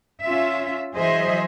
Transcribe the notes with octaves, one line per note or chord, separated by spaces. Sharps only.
C#4 F4 E5
E3 F#3 G#4 C5 D#5 E5